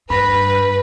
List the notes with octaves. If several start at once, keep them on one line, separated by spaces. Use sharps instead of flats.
G2 B4 B5 A#6 B6